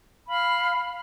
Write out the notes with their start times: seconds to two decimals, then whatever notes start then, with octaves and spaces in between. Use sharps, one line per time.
0.29 F5 B5 F6